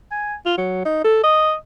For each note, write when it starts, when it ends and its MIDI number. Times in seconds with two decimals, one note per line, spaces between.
0.11 0.34 80
0.46 0.55 65
0.57 0.80 54
0.85 1.04 63
1.04 1.22 69
1.23 1.54 75